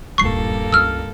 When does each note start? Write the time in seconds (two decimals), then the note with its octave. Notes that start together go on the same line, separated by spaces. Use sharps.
0.18 D#1 C#2 G2 A#3 A4 C#6 C7
0.73 C#2 E6 F6